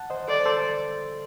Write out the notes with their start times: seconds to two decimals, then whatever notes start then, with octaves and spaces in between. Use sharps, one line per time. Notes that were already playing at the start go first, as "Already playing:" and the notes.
Already playing: F#5 A5
0.10 C5 D#5
0.28 A4 C5 D5
0.46 A4 C5